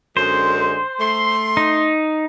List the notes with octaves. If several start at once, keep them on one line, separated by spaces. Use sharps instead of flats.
F#2 D3 G#3 C5
A3 C6
D#4